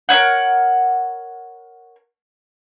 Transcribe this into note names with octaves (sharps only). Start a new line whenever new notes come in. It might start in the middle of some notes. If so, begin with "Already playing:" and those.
A#4 B4 C#5 F#5